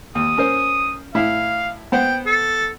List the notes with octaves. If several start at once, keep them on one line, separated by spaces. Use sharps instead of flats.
D#2 D#6
C#4 A#4 C5
A2 E4 E5 F5
B3 C5 F#5 G5
A4